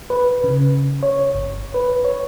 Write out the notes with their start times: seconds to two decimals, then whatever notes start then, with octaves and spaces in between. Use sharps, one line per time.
0.10 B4
0.44 C#3
1.03 C#5
1.35 G1
1.74 B4
2.04 C#5